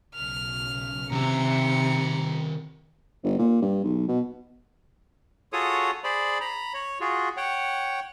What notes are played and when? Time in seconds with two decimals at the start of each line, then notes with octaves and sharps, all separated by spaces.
0.15 B1 C#3 F6
1.12 C3 D#3 E5 A#5 C#7
3.24 G1
3.39 A#2
3.62 G2
3.84 B1
4.08 B2
5.53 F4 F#4 G#4 A4 C#5 D#6
6.04 G#4 C5 D5 B5
6.41 A#5 B5
6.74 C#5
7.00 F4 F#4 G#4
7.37 C#5 F#5 G5